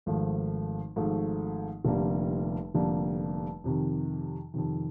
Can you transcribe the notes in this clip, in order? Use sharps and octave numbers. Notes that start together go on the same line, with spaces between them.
G#1 G#2 F3 A3
G#1 G#2 F3 A3
F1 F2 D3 G3 A#3
F1 F2 D3 G3 A#3
F2 C3 D#3
F2 C3 D#3